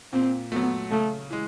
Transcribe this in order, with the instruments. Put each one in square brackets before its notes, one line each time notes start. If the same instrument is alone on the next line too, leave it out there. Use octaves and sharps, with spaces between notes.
[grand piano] A#2 [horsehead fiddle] C4
[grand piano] F#3 A3 [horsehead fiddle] B3
[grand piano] C#3 [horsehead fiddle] A3
[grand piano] E3 G#3